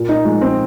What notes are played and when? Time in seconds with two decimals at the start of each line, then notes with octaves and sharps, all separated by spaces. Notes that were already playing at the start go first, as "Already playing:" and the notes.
Already playing: A#2
0.09 D#4
0.25 F3 G#3
0.41 C4